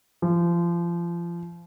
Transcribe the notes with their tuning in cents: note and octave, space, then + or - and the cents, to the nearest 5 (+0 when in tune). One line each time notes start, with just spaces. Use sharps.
F3 -30